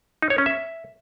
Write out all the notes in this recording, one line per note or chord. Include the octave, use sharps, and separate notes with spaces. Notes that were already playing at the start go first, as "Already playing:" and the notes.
D#4
C#5
C#4
E5